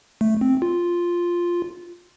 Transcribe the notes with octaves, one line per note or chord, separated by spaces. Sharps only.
A3
C4
F4